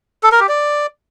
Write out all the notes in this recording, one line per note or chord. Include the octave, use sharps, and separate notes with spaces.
A4
A#4
G4
D5